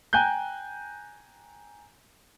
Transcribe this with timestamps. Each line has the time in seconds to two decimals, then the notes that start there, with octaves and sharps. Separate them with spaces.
0.13 G5 G#5 A#5 F#6 G6